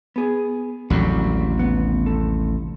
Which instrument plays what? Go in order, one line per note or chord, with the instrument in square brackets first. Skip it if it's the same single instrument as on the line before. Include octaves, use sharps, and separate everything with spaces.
[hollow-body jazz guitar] B3 G#4
[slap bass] A1 D#2 C3 [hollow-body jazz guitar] F#3 G3 A3
[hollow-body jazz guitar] B3
C2 A4